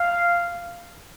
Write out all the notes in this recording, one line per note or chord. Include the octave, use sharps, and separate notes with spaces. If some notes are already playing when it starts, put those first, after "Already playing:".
Already playing: F5